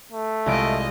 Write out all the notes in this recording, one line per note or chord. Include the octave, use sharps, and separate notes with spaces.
A3
C2 G#3 F4 D#5 D7